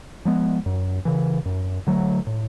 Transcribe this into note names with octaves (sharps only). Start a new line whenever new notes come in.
F3 G#3 B3
F#2
C#3 E3
F#2
D3 F#3 A3
A2